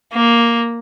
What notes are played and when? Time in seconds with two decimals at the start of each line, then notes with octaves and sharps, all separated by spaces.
0.13 A#3